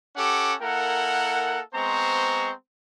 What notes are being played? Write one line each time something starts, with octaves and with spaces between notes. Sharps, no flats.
C#4 G4 A4 F#5 D6
A#3 E4 A4 A#4 F#5
G#3 B3 C4 C5 A#5 C#6